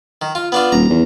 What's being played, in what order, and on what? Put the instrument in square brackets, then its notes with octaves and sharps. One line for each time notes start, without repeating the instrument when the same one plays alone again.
[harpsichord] D#3
F4
B3 D4 F4
[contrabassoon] D#1 [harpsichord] A#5
[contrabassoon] E2